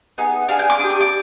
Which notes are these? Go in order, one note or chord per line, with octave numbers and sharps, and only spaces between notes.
B3 D#4 G#4
D4 G#4 F5
G5
D6
D4 G4 D#6
D6
D6